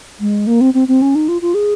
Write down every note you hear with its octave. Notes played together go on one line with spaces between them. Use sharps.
G#3
A#3
C4
C4
C4
C#4
D#4
F4
F4
G#4